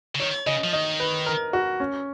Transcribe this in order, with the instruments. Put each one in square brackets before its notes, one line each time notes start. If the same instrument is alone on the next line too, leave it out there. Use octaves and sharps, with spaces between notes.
[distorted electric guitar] C#3
[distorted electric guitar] D#3 [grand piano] C#5
[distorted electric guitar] C#3 [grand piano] D#5
[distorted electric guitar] F3
[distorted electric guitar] D#3 [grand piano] D#5
[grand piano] B4
A#4
F#4
C#4